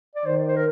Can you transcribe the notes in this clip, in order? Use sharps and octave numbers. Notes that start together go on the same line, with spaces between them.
D5
D#3 C5
C5
A#4